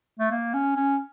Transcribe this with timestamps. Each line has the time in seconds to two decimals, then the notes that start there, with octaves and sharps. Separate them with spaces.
0.19 A3
0.31 A#3
0.54 C#4
0.77 C#4